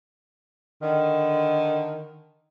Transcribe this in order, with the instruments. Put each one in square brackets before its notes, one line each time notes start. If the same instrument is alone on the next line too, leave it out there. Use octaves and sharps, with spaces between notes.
[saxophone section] D3 D#3